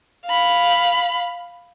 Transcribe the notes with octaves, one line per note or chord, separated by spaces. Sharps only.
F5 B5